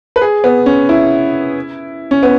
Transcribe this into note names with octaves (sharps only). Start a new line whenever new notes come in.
B4
G#4
B3
C#4
E4
C#4
B3